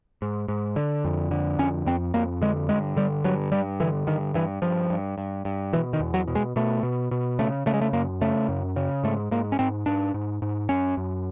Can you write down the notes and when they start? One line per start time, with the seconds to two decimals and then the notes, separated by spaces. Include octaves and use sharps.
0.22 G#2
0.48 G#2
0.76 D3
1.05 F2
1.31 D3
1.59 F2 C#4
1.86 F2 C4
2.14 F2 A#3
2.41 D3 G#3
2.69 G2 G#3
2.97 D3 G3
3.24 G2 F#3
3.52 G2 G3
3.80 D3 E3
4.07 G2 D#3
4.34 G2 E3
4.62 G2 F3
4.90 G2
5.18 G2
5.45 G2
5.73 B2 E3
5.93 D#3
6.00 E2
6.14 F#3
6.27 B2
6.35 G#3
6.56 B2 A3
6.83 B2
7.11 B2
7.39 C#3 A3
7.66 C#3 A3
7.74 G#3
7.81 A3
7.93 F#2 A#3
8.21 C#3 A3
8.49 F#2
8.76 C#3
9.04 G#2 A3
9.31 G#2 A#3
9.52 C#4
9.59 G#2 C4
9.86 G#2 D4
10.14 G#2
10.42 G#2
10.69 F#2 C#4
10.97 F#2